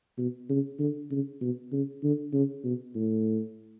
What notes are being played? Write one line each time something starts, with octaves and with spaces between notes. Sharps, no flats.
B2
C#3
D3
C#3
B2
C#3
D3
C#3
B2
A2